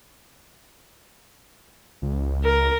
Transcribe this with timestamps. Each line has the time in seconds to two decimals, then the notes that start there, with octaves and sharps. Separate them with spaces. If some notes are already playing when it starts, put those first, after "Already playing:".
2.02 C#2
2.44 A#4